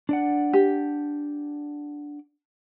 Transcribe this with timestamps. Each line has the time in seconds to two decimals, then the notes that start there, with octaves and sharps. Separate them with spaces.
0.09 D4 D5 F#5
0.53 G4